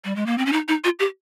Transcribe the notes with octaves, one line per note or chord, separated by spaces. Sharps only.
G3
G#3
A#3
C4
C#4
D#4
D#4
F4
G4